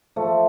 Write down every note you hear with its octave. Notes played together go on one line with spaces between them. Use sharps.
F3 A3